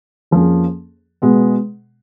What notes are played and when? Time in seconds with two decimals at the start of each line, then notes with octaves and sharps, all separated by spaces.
0.31 F2 F3 A#3 C#4 G#4
1.22 B2 G#3 B3